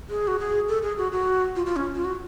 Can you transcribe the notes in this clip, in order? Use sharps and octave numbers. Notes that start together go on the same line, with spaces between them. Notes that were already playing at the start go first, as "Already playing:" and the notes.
G#4
F#4
G#4
A4
G#4
F#4
F#4
F4
F4
C#4
F4
F#4